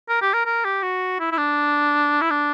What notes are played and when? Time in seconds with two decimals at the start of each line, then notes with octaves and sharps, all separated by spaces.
0.09 A#4
0.21 G4
0.33 A#4
0.46 A#4
0.65 G4
0.83 F#4
1.20 E4
1.32 E4
1.38 D4
2.22 E4
2.31 D4